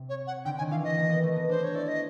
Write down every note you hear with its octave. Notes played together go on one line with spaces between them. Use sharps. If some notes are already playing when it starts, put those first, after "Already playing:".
Already playing: C3
C#5
F#5
D3 G5
D#3 G#5
E3 F5
D#5
A#3
B3
A3
B3
D4 C5
C#5
E4 D5
D#5